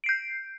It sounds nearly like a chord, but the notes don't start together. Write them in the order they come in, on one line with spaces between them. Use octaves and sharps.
D7 C7 G6